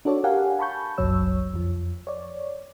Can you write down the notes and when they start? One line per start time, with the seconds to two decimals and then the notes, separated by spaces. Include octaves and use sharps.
0.05 D4 F#4 A4 C#5 D5
0.24 G4 A#4 F5 F#5 G#5
0.59 A5 B5 C#6 G6
0.98 G1 C2 F#2 F#3 C#5 E6
1.54 F2 F3
2.07 C#5 D5